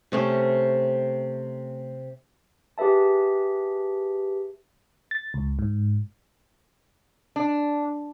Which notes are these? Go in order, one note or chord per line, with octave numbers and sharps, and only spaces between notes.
C3 A3 C#4
G4 G#4 B4 E5 A5
A6
C#2
G#2
D4